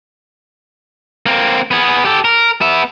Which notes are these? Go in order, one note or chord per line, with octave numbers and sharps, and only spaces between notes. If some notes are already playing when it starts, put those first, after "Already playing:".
A#3 C4
B3 G#4
G4 A4
A#4
B3 E5